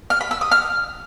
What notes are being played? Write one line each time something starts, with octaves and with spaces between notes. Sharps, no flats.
F6
B5
E6
D#6
F6